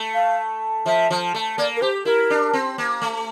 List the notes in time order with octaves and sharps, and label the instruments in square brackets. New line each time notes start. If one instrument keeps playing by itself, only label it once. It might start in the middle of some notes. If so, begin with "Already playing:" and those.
Already playing: [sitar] A3
[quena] F5
[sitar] F3 [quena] E5
[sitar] F3
A3
[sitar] A#3 [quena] D5
[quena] A#4
[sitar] G4 [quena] C5
[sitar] E4 [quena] A#4
[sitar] D4
C4
A#3
A3